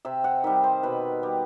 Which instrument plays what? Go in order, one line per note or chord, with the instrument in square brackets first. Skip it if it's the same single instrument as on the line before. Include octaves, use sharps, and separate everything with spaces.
[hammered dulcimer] C3 E5
F#5
D#3 G3 E5
C5
B2 B4
G3